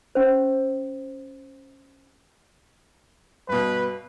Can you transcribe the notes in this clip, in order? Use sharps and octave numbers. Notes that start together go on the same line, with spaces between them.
C#4 C5
G2 B2 B4